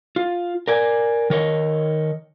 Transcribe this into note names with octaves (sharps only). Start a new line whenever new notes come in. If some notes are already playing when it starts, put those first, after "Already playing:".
F4
A#4 D5 G#5
D#3 A#4 C#5 D#5